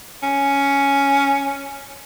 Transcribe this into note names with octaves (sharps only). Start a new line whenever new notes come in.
C#4